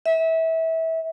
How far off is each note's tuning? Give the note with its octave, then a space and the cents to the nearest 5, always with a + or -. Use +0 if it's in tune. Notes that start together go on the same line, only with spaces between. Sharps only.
E5 -25